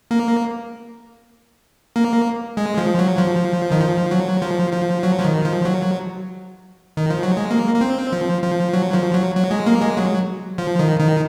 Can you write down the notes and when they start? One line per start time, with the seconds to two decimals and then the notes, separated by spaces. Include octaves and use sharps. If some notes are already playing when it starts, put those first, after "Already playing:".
0.11 A#3
1.96 A#3
2.57 G#3
2.78 F3
2.99 F#3
3.19 F3
3.71 D#3
3.80 F3
4.11 F#3
4.42 F3
4.73 F3
5.03 F#3
5.18 F3
5.25 D#3
5.44 F3
5.65 F#3
6.97 D#3
7.10 F3
7.23 F#3
7.37 G#3
7.51 A#3
7.75 A#3
7.81 C4
8.12 F3
8.43 F3
8.73 F#3
8.94 F3
9.14 F#3
9.35 F#3
9.51 G#3
9.66 A#3
9.82 G#3
9.97 F#3
10.58 F3
10.79 D#3
11.00 D#3